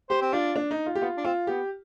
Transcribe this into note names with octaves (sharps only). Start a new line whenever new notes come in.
G4 C5
C4
D4 F4
D4
D#4
F4
G4
B3 F4
D4
C4 F4
B3 G4